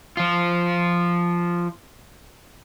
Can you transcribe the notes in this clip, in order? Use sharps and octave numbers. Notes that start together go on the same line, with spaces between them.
F3 F4